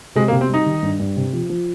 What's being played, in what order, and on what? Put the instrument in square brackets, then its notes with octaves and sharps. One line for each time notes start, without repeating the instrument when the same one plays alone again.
[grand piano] C3 [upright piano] G#3
[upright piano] A#3
[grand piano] C3
[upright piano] C4
[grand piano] G3 [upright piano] D#4
[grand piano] D#3
G2
G2
C3
F3
F3